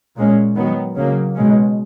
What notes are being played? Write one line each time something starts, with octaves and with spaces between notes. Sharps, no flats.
A#2 G#3 C#4
D#3 F#3 B3
C#3 F#3 A#3
B2 G#3 C#4